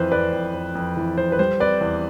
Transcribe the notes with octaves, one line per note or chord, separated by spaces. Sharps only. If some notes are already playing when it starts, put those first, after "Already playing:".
Already playing: F2 E3 B4 C5
F2 B4 D5
F2
F2
F2
E3
F2 C5
B4
G3 C5
C4 B4 D5
E2